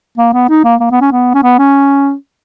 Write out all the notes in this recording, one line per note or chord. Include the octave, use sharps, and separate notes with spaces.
A#3
B3
D#4
A#3
A#3
B3
C#4
B3
C#4
B3
C#4